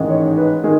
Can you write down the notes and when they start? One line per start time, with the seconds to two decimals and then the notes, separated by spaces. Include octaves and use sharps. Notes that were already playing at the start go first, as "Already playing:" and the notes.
Already playing: A1 G#2 D#3 G#3
0.10 C#5
0.37 B4
0.64 D#3 G#3 G#4